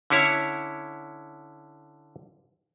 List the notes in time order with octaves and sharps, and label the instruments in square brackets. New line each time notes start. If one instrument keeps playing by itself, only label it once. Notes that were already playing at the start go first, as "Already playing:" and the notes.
[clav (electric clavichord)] D3 C#4 E4 C#5